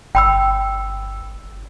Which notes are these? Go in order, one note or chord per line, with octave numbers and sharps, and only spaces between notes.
G1 G5 B5 E6